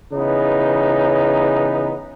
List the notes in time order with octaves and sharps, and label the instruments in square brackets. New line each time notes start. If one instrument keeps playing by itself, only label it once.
[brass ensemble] C#3 E3 B3 D#4